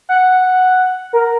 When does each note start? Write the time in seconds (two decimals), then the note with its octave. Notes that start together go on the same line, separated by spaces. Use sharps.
0.09 F#5
1.13 A#4